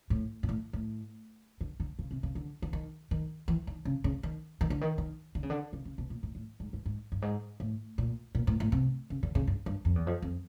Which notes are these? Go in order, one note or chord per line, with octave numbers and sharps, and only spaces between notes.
A2
A#2
A2
A2
D3
D3
C#3
C3
C#3
D3
D3
D#3
D#3
E3
D#3
C#3
C#3
D#3
D#3
D3
D#3
D#3
D3
C#3
D3
C#3
C#3
B2
A#2
A2
A2
G#2
G#2
G#2
G2
G#2
A2
A#2
A#2
A2
A2
C3
C#3
D3
C#3
G2
G2
F2
E2
F2
F2